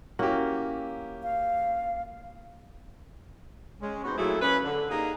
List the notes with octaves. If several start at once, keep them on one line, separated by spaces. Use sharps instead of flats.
A#3 C#4 E4 F#4 G4
F5
G#3 C#4
B3 C4 D#4 F#4 G#4 C5
A#2 F#3 A3 E4 G#4 A4
C#4 B4
D3
A#3 D#4 G4 G#4